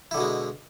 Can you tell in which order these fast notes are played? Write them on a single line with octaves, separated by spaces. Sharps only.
E4 D3 B2 G#3